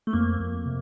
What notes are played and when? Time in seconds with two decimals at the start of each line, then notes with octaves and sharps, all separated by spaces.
0.07 A3
0.13 F2 A#3
0.39 F2
0.66 C3